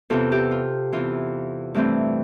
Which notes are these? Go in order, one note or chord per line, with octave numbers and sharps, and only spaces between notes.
E2 C3 E3 F4 A4
E4 G4
F4
E2 C3 E3 F4
G2 E3 A3 C4